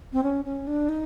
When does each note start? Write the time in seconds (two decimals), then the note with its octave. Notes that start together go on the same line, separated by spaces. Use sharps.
0.13 C4
0.23 C#4
0.45 C#4
0.67 D4
0.89 D#4